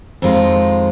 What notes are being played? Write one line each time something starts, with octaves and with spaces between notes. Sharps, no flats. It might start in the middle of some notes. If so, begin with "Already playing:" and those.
F2 D#3 G#3 F4